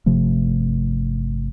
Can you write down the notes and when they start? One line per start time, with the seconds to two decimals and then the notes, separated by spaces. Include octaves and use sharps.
0.06 G1 C3 F3 A3